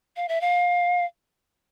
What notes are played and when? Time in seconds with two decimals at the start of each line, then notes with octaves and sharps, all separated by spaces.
0.16 F5
0.29 E5
0.41 F5